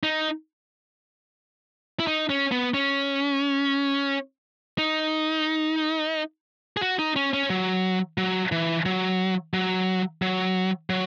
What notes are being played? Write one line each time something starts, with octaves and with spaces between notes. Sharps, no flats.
D#4
E4
D#4
C#4
B3
C#4
D#4
G#4
F#4
D#4
C#4
C#4
F#3
F#3
E3
F#3
F#3
F#3
F#3